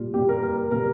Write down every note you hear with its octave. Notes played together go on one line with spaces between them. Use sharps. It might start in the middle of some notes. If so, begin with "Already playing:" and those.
Already playing: A#2 G3 F4
A#2 G3 G4
A#4
A#4
A#4
A#2 G3 A#4